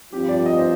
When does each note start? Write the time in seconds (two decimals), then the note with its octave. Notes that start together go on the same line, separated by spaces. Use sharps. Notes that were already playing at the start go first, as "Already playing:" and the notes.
0.12 G2 F3 C4 F4 G4
0.28 D5
0.46 D#5
0.58 C5